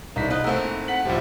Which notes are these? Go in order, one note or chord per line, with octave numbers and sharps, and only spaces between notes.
C2 E3 D#4 B6
B2 F4 D#5 F#6
G#2 A3 A#3 C4 G#4 A#4 E5 F#5
E4
F#5 B6 F#7
D#1 C#2 F3 E4 G4 C5 E5